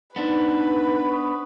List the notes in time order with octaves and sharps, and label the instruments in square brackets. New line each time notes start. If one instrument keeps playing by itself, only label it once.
[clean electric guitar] B3 D4 C5 [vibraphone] D#4 [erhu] B4
[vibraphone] C#6 D#6